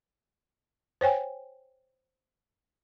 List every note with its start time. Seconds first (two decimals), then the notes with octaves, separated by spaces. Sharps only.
1.01 C5 C#5 G5 G#5